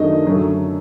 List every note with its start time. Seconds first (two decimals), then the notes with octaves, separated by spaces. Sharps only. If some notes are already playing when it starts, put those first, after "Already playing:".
Already playing: F#2 D#3 F#3 A3 D4 D#5
0.25 F#2 D3 F#3 A3